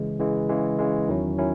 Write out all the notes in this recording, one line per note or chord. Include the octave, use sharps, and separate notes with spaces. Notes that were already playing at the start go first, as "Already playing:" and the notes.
Already playing: C#3 E3 G#3
C#3 E3 G#3
C#3 E3 G#3
C#3 E3 G#3
E2 D#3 F#3 C#4 E4
D#3 F#3 C#4 E4